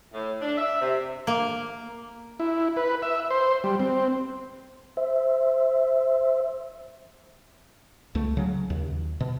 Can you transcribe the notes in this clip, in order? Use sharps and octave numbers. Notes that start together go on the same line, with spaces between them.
A2
D4
E5
C3
A#3
E4
B4
E5
C5
G3
C4
C5 E5
C#2 A3
C#3 F#3
D#2
B2